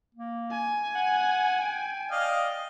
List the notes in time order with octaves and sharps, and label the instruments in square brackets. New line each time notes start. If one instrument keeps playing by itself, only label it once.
[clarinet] A#3
[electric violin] G#5
[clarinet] F#5
G5
[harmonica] D5 D#5 F5